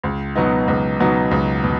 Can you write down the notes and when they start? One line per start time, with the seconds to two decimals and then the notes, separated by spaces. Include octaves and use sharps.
0.04 C#2
0.36 B2 F#3 B3 D#4
0.68 C#2
1.00 B2 F#3 B3 D#4
1.31 C#2
1.64 B2